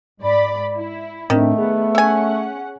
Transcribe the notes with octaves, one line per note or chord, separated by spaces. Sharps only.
G#2 D5 B5
E4
A2 D#3 A3 C4 D4
B3 G#4
C#4 E5 F#5 G#5